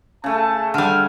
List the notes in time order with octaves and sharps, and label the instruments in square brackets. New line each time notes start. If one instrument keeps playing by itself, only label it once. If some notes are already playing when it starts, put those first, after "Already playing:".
[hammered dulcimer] C#3 A3 [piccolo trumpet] A5
[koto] D3 G3 [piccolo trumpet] F6